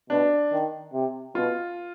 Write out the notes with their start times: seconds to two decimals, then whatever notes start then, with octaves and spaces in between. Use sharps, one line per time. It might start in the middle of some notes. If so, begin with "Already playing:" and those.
0.10 B2 D4
0.52 D#3
0.93 C3
1.35 B2 F4